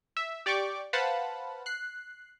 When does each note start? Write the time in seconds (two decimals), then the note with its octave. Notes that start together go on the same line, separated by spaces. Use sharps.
0.17 E5
0.46 G4 D5 G5 C#6 D6
0.93 B4 C5 F5 F#5 A5 B5
1.66 F#6 C7